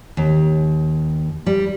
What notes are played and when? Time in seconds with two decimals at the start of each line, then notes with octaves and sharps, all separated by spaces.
0.17 D#2
1.46 G3